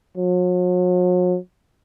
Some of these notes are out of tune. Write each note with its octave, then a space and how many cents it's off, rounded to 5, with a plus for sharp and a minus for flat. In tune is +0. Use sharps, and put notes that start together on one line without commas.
F#3 -45